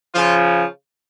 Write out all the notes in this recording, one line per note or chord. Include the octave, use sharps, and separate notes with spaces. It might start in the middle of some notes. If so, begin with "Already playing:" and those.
C#3 F3 F4